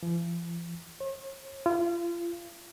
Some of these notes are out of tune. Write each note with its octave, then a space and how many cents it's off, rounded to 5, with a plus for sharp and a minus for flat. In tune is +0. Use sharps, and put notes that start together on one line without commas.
F3 -45
C#5 -45
F4 -30